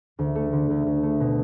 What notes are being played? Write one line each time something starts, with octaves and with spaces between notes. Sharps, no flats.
D2
A3
D3
D2
D2
A3
B2